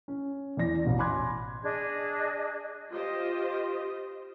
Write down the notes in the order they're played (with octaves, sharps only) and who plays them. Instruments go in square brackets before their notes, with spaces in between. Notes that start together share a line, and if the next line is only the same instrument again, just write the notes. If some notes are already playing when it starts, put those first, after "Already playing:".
[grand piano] C#4
E2 E3 D5 A#6
A1 B2
G#5 B5 C6 D6 F#6 G#6
[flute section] D4 G#4 D#5 G#6
[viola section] F4 G4 C5 D#5